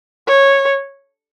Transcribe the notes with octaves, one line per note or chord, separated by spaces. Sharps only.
C#5